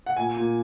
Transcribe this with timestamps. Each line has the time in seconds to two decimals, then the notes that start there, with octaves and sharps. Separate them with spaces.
0.06 F#5
0.16 A#2 G#5
0.37 A#2